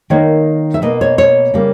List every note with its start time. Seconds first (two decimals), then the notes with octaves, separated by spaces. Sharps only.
0.10 D#3 A#3 C#5
0.74 E5
0.82 B2 A#3 D#5
1.01 C#5
1.18 C#5
1.54 C#3 G3 A#3